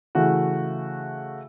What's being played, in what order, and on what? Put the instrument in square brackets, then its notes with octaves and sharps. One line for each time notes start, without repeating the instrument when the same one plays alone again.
[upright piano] C#3 E3 A3 F#4